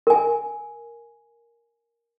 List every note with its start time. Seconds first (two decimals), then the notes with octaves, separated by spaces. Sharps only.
0.07 A#4 G#5